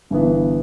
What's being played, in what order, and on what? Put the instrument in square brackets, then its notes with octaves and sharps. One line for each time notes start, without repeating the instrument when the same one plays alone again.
[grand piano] G1 G2 E3 B3